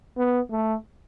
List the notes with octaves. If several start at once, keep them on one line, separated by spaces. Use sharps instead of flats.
B3
A3